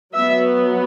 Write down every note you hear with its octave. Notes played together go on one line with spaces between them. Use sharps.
F#3 B3 E5